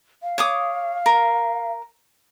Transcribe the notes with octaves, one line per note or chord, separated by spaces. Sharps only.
F5
C#5 D6 D#6
A#4